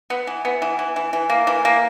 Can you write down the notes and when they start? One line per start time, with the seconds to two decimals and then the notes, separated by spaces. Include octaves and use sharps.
0.10 B3
0.27 E3
0.45 B3
0.62 E3
0.79 E3
0.96 E3
1.13 E3
1.30 A#3
1.47 E3
1.65 A#3